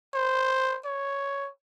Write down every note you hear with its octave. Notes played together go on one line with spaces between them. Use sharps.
C5
C#5